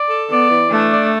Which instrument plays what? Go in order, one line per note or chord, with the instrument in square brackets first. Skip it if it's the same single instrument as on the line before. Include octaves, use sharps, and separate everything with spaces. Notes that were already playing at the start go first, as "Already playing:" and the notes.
Already playing: [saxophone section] D5
A4
[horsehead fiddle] B3 [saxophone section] D5
[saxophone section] E3
[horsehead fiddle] A3 [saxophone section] D4
[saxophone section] D5